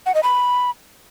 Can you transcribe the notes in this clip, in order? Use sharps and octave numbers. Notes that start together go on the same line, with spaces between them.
F#5
D#5
B5